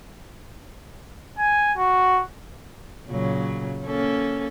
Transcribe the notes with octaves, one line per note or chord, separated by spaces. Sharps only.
G#5
F#4
A#2 C#3 F#3
A#3 C#4 A4